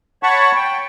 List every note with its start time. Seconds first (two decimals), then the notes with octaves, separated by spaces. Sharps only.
0.23 C#5 F#5 A5 B5 C#6
0.55 G5